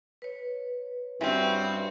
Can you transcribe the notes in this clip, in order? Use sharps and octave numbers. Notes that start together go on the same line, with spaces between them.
B4 C#5
G2 C4 C#4 E4 F#4